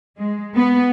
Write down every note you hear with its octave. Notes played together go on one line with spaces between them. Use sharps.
G#3
B3